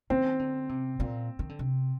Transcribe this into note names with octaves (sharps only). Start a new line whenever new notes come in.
D#3 C4
D3
C3
A#2
D#3
D3
C3